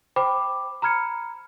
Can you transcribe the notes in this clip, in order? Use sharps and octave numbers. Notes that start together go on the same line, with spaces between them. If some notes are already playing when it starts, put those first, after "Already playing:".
C5 G5 B5 D6
A#5 B5 F6 G#6 C#7